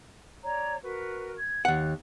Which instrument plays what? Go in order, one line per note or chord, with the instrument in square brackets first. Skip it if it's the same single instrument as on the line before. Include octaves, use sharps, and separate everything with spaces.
[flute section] C#5 D5 A#5
F#4 A#4 B4
G#6
[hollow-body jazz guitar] D#2 F#5 [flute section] F#6